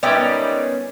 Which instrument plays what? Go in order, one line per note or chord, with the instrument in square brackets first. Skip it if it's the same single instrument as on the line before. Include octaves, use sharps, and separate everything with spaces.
[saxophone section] G#2 D#3 G3 [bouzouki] B3 C#4 [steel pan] D5 E5 G5